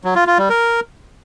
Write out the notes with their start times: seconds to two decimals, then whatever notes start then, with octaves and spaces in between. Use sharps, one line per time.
0.04 F#3
0.16 F4
0.27 F4
0.38 G3
0.49 A#4